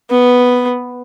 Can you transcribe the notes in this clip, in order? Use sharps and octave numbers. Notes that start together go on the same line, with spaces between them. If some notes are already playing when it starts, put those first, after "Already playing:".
B3